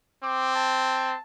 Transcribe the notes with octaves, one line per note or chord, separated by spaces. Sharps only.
C4 D6
A5